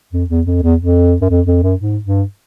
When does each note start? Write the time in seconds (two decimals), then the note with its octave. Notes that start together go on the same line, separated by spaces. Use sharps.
0.12 F2
0.30 E2
0.46 F2
0.62 E2
0.80 F2
1.21 F#2
1.29 F2
1.46 F2
1.63 F#2
1.80 G#2
2.05 G2